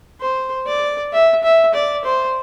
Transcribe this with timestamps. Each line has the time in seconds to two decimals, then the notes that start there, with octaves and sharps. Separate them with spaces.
0.20 C5
0.66 D5
1.12 E5
1.43 E5
1.74 D5
2.05 C5